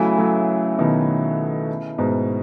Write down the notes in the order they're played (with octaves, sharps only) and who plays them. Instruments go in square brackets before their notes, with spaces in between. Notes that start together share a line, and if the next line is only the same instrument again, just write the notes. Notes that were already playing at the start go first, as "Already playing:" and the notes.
Already playing: [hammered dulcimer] C#3 E3 B3 E4 [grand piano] F#3 A3
[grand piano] F#3 A3
B2 D#3
G#2 B2